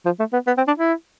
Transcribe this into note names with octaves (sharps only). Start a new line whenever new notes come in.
F3
A3
B3
B3
C4
D4
E4